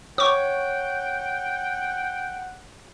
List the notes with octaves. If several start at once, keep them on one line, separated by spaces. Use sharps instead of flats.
C#5 F#5 G5 C#6 D6